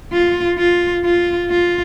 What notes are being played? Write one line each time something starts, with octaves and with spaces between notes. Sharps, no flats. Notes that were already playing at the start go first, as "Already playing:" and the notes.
F4
F4
F4
F4